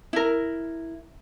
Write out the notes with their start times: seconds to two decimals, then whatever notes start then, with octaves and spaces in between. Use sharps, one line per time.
0.13 E4 A#4